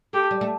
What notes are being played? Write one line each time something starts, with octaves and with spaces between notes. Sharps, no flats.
A3 G4
G3
A3